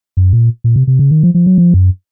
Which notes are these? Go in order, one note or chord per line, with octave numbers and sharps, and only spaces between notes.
F#2
A#2
A#2
C3
C3
C#3
D#3
F3
F3
F#3
F3
F#2